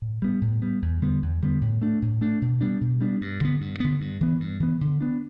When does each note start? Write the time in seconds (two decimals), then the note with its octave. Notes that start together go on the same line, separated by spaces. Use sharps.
0.02 A2
0.22 G3 B3
0.41 A2
0.62 G3 B3
0.82 E2
1.02 D3 G3 B3
1.22 E2
1.42 D3 G3 B3
1.61 A2
1.82 A3 D4
2.02 A2
2.21 A3 D4
2.42 B2
2.61 G3 B3 D4
2.81 B2
3.01 G3 B3 D4
3.21 G2
3.41 D3 B3
3.61 G2
3.80 D3 B3
4.01 G2
4.21 E3 B3
4.40 G2
4.60 E3 B3
4.81 D3
5.01 B3 D4